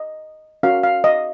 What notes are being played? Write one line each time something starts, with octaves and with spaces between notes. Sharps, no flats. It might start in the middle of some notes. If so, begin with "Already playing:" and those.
Already playing: D#5
C#4 F#4 A#4 F5
F5
D#5